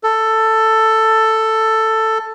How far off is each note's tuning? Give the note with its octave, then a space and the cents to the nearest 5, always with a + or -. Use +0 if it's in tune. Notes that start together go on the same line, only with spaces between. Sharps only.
A4 +10